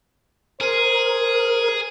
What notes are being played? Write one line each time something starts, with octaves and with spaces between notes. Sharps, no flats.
G#4 A#4 C5